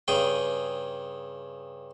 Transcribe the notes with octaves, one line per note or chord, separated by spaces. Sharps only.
G2 C#3 G#4 G5